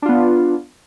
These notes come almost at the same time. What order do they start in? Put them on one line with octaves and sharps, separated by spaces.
D4 F4 B3